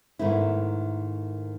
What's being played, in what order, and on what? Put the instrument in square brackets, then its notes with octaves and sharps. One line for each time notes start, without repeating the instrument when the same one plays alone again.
[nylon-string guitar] G#2 D#3 A3 B3 E4